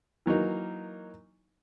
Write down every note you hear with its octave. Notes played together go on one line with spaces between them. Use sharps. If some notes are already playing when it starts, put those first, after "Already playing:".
E3 F#3 A#3 D#4